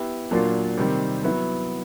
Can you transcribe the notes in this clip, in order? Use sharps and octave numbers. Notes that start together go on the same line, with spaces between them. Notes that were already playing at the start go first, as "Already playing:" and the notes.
Already playing: B3 E4 G4
A#2 F#3 A#3 D4 F4
C3 D#3 G3 C4
F#3 B3 E4